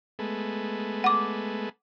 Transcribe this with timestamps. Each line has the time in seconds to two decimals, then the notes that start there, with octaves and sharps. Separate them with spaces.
0.19 G#3 A3 B3
1.04 F#5 D6